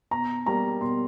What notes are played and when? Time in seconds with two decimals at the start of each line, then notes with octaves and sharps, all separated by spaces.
0.11 B2 A#5
0.46 G3 A#3 A#5
0.81 B2 C6